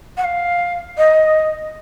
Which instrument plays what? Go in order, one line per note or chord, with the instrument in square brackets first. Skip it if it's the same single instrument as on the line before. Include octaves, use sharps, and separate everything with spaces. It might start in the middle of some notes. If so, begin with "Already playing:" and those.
[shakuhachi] F#5
F5
D#5